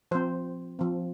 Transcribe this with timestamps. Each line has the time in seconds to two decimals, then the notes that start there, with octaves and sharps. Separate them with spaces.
0.11 F3 C4 C5
0.79 F3 C4